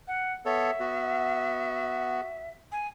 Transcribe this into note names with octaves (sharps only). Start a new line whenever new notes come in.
F#5
B3 A4 C#5 E5
B3 F#4
G#5